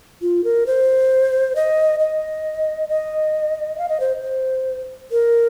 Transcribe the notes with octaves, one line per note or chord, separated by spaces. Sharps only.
F4
A#4
C5
D#5
D#5
D#5
F5
D#5
C5
C5
A#4